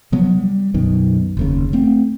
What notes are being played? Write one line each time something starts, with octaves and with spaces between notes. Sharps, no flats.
C3 F3 F#3 B3
G3
B1 F#2 B2 D#3
F1 D#2 C#3
A3 C4